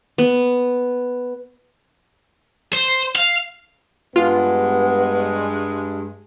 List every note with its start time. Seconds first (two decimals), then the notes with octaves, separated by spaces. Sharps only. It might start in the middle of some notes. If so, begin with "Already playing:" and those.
0.18 B3
2.73 C5
3.16 F5
4.16 G2 G#3 B3 F4